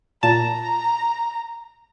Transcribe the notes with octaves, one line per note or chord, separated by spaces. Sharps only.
A#2 A5 A#5